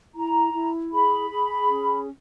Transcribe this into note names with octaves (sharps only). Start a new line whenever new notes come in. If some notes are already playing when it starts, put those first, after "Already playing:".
E4 A#5
E4
G#4 B5
G#4
C#4